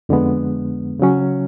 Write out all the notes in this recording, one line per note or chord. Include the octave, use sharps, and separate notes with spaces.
F2 D3 G#3 B3
C#3 F#3 C#4